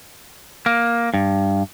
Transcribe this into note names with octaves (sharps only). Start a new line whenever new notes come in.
A#3
G2